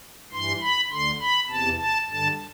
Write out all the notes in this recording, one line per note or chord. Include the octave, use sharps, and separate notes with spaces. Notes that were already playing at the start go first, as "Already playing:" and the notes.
G2 E3 C6
B5
D2 D3 C6
B5
E2 C3 E3 A5
A5
G2 D3 A5